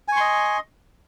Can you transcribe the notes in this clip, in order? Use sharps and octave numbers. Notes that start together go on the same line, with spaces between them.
D#5 G#5 C6 C#6